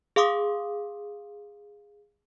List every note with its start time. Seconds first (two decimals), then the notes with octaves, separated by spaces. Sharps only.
0.16 G#4 F5 C6 D6 D#6